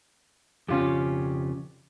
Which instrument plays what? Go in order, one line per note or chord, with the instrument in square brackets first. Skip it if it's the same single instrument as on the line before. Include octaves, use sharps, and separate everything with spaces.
[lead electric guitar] F2 C#3 [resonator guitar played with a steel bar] C#4 F4 G4